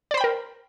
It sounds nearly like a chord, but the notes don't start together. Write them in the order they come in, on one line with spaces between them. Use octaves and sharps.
D5 C5 B5 G5 A#4